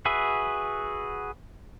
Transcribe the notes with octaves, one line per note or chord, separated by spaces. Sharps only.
F#4 G#4 B4 E5